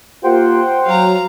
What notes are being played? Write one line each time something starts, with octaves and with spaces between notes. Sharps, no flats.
A#3 F4 G4 C5 F#5 G5
F#3 F5 A#5